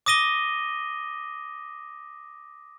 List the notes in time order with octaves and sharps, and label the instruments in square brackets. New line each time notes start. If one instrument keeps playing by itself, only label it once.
[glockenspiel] D6 D#6 A#6 D#7 G7